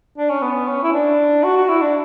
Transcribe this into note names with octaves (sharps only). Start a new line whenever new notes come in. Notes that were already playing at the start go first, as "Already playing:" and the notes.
D4
C#4
B3
C#4
E4
D4
F#4
F#4
E4
D4